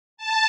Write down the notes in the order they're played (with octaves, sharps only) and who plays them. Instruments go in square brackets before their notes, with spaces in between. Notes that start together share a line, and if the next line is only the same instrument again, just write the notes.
[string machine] A5